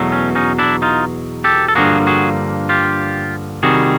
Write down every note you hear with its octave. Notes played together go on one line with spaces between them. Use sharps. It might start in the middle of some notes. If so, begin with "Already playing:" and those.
Already playing: E2 B2 F#3 A3
C#4
C#4 D#4
D4 E4
D#4 F4
G4 A4
A4
G2 D3 F3 A#3 F#4 G#4
F#4 G#4
F4 G4
C3 D#3 G3 F#4 G#4